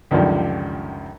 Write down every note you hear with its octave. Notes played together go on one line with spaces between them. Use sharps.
C#2 F#2 D3 D#3 F3 G3